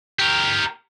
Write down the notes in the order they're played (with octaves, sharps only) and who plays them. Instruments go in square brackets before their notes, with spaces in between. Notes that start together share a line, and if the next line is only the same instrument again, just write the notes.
[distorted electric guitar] G4 A#4